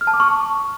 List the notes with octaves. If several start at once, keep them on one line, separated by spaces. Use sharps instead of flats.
F6
A5
D6
C#6